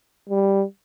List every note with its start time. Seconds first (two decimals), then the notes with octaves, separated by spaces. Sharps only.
0.29 G3